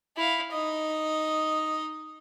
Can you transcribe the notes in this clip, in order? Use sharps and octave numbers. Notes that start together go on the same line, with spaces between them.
E4 F5
D#4 D#5